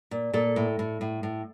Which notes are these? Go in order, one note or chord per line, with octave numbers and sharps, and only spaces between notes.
A#2
A#2 A4
A2
A2
A2
A2